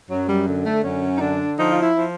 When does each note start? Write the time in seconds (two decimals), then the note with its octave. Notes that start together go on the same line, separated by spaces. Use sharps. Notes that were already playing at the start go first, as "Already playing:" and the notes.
0.10 F#2 F#3
0.28 G3
0.47 D3
0.65 A3
0.84 F#2 C#4
1.16 D#4
1.20 D3 D4
1.57 F3 D#4
1.71 F4
1.82 E4
1.95 F3